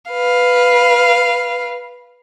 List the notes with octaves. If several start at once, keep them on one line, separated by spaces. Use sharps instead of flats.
B4 F5